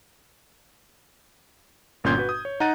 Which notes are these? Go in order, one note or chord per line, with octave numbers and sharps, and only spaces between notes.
G1 A#2 C#4 C6 G6 G#6
F#4 B4
D#6
C#5
D#4 F#5 A#5 F#6 A6 D#7